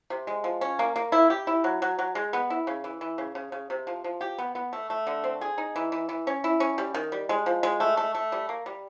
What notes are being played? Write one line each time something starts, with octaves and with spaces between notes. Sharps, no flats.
C3
G#3
F3
C#4
A#3
A#3
E4
G4
E4
F#3
F#3
F#3
G#3
B3
E4
C#3
E3
E3
C#3
C#3
C#3
C3
F3
F3
G4
B3
B3
A3
A3
D3
C4
G#4
D#4
E3
E3
E3
C#4
E4
C#4
G3
D#3
G3
G#3
F3
G#3
A3
A3
A3
G3
A#3
G3